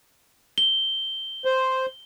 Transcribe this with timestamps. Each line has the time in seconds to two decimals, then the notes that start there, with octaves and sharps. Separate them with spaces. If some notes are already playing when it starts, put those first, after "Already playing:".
0.58 G7
1.45 C5